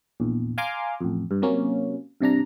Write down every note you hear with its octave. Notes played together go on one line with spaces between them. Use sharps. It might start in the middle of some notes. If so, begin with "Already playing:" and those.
A#1 E2
F5 G#5 A#5 C6 D6 F6
A1 F2
G2
C3 F#3 A#3 C#4
G2 C3 D4 A#5